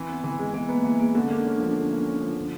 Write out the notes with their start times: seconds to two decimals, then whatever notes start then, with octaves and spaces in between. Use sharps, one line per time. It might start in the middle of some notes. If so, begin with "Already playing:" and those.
Already playing: E3 C4
0.09 B3
0.24 E3
0.39 G#3
0.54 E3 B3
0.69 A#3 B3
0.84 E3 A#3
1.00 G#3 B3
1.15 D3 C#4
1.30 A#3 D4
1.46 C#4
1.60 F3
1.76 D3
1.91 A#3
2.06 C#4
2.21 F3
2.36 D3